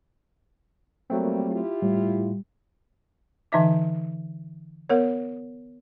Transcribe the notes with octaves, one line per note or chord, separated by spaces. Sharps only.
F#3 G3 A3 A#3 C4
E4 F4 G4
A2 G3
D3 E3 D#4 D#5 E5 D6
B3 A#4 C#5